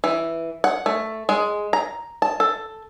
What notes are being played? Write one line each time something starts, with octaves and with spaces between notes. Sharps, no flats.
E3
F#5
A3
G#3
A#5
A5
A4